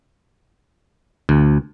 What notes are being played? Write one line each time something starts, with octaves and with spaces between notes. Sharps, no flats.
D2